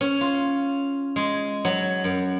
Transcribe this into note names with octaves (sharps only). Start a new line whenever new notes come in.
C#4
F4
G#3
F#3
F#2